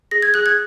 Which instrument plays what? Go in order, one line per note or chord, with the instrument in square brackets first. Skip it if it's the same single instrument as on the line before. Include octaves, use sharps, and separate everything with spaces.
[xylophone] G#4 A#6
G#6
G#4 F#6
G#6